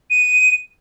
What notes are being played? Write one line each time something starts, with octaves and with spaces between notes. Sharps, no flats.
D#7